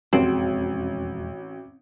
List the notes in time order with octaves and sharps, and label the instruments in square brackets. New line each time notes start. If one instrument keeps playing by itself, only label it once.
[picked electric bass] E1 F2 G#3 [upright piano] A1 [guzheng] C4 [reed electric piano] F#4